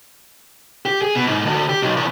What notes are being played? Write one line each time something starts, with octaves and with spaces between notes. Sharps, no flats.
G4
G#4
B2
G#2
D2
G4
B1
E2